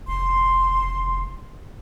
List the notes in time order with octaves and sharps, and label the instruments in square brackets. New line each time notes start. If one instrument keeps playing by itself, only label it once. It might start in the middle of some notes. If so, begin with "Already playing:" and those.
[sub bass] F1 [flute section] C6